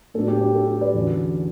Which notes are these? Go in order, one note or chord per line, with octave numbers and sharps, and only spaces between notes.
A2 F#3 B3 D4 A4
G4
G4
A4
G4
B4 D5
E2 D3 F#3 C#4